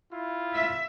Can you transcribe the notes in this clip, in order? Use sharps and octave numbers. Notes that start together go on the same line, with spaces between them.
E4 F4
E5